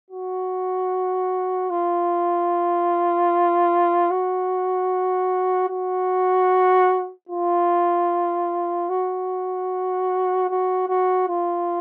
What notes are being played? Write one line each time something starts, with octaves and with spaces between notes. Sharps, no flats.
F#4
F4
F#4
F#4
F4
F#4
F#4
F#4
F4